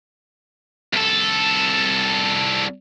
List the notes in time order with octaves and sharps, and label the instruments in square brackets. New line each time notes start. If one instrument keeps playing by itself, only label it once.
[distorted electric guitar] C2 A4